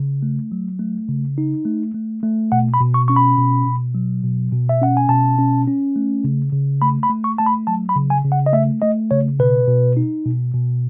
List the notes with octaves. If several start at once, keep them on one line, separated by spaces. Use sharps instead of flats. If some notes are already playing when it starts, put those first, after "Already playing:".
Already playing: C#3
A3
F#3
A3
C#3
D#4
A3
A3
A3
B2 F#5
B5
B2
C#6
C#4 C#6
B5
B2
B2
F#3
B2
B2
E5
C#4 F#5
G#5
B2 A5
C#4
C#4
A3
C#3
C#3
A3 B5
B5
A3
C#6
A3 A5
B5
F#3 A5
B5
C#3
G#5
C#3
F#5
D#5
A3 E5
A3 D#5
C#3 C#5
B2 B4
B2
D#4
B2
B2